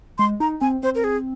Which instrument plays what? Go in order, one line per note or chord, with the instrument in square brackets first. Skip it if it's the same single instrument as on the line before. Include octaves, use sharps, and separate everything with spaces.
[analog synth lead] G#3 [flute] C6
[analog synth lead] D#4 [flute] A#5
[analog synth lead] C4 [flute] G#5
[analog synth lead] C4 [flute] C5
[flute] A#4
G#4